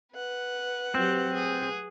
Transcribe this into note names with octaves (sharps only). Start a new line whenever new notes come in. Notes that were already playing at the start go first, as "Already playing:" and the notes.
B4 F#5
F#3 C4 G4
G#4